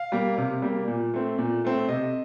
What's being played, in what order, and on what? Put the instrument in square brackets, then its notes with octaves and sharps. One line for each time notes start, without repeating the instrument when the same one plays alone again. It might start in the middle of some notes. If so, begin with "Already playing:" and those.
Already playing: [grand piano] F5
G3 A#3
C3
G3 A#3
A#2
A3 C4
A#2
A3 C4
C3 D#5